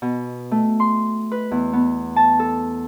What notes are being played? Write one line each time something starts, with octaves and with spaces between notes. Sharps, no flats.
B2
A3
C6
B4
E2
B3
A5
A4